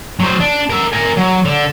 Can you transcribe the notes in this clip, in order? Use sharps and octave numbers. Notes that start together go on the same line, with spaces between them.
F#3 C5
D4
A#4 E5
A#4 G#5
F#3
D3